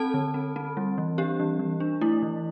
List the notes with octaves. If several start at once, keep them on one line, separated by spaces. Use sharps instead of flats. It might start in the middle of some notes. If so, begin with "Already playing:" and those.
Already playing: C4 A4 A5
D3
C4
C4
G3
E3
D4 G4
E3
E3
D4
A3 E4
E3